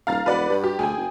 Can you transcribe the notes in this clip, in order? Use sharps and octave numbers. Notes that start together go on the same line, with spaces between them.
D#1 F5 A#5 A6
E1 B4 D5 F#5
G2
G4
D2 G#4 G5 G#5
F#1